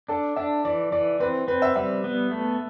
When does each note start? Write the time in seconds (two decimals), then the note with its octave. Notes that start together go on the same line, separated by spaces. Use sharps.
0.08 D4 A4
0.36 D4 E5
0.65 E3 D5
0.92 E3 D5
1.20 C4 B4
1.48 C4 B4
1.62 E5
1.76 G3 E5
2.04 B3
2.31 A3